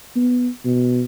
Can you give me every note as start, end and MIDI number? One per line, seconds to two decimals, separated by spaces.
0.16 0.49 59
0.65 1.05 47